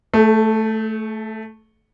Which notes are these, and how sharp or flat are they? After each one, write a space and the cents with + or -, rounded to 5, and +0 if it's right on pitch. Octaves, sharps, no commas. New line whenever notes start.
A3 +0 A4 -40